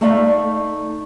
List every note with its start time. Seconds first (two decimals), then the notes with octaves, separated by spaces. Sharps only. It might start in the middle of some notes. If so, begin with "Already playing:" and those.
0.01 A3 D#4 D5 E5 F5